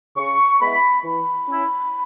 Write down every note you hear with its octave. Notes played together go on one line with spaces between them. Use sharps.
C#3 C#6
G#3 B3 E4 B5
E3 B5
C#4 E4